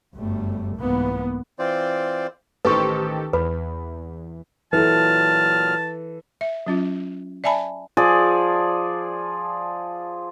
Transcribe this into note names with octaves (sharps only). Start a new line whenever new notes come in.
G1 F#2 G3 A3
C2 G#2 E3 A#3 B3
E3 C4 F4 C5 D5
A1 D#3 G4 A4 B4 C5 C#6
E2 B4 B5
A#2 E3 F#3 A4 A5 F6
E5
F#3 C#4 F4
D5 E5 G#5 A5 B5
F3 G#4 D5